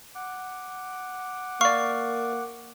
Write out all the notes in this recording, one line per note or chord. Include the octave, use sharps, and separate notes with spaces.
F#5 D6
A#3 D5 F5 C#6